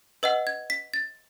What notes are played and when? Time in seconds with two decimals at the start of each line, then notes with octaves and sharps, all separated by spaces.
0.23 B4 D#5 F#5 E6
0.47 G#6
0.70 B6
0.94 A6